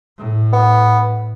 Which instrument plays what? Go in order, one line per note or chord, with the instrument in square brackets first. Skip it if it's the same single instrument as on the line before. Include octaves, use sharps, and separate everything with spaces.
[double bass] A2
[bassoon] B3